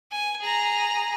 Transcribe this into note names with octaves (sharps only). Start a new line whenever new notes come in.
G#5
G#4 A#5